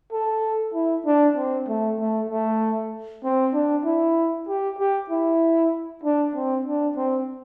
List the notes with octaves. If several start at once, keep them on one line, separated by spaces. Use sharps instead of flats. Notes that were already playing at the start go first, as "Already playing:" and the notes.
A4
E4
D4
C4
A3
A3
A3
C4
D4
E4
G4
G4
E4
D4
C4
D4
C4